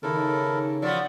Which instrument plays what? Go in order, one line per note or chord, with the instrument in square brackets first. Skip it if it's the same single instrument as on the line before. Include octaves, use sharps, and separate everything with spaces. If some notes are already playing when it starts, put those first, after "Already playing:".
[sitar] D#2 [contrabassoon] C#3 [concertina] E4 A4 A#4
[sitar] F3 B3 [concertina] F#4 E6 [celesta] D5 F#5